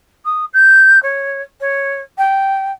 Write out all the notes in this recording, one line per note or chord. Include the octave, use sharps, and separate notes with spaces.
D#6
G6
C#5
C#5
G5